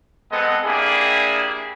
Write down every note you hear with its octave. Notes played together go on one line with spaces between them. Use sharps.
G#3 B3 C4 A4 D#5 F#5
A#3 D4 E4 G4 G#4